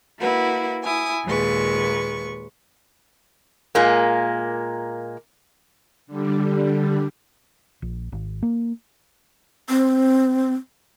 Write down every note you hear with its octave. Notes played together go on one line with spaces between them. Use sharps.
A#3 E4 F#4 B4
E4 G#5 D#6
D#2 A#2 G#3 B4 C#6
A#2 G#3 A#3
D3 G3
A#1
G#1
A#3
C4